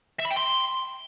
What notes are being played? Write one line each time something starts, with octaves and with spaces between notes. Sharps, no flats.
E5
B5
G5
C6